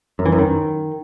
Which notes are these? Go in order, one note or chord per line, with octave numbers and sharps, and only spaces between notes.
F#2
E3
F#2
D#3